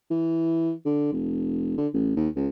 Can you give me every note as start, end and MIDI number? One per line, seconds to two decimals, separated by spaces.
0.11 0.72 52
0.85 1.08 50
1.12 1.76 29
1.77 1.88 50
1.94 2.12 33
2.16 2.29 39
2.36 2.48 37